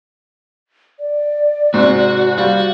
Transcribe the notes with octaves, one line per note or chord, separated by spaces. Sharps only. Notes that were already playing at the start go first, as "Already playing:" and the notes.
D5
G#2 C3 F#4
G3 F#4 F5